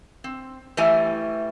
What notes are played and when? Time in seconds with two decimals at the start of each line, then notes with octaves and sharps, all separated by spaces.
0.24 C4
0.77 E3 G3 A3 D#5 E5 G#5